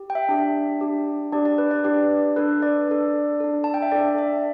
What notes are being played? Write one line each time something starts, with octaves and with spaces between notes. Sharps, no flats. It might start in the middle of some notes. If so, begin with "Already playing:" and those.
Already playing: G4
G5
E5
D4 G4
D4 G4
D4 G4 D5
D5
B4
D5
D4 G4 D5
D4 A4 B4
D5
D4 A4
D4 A4
A5
G5
E5
D4 A4 D5
E5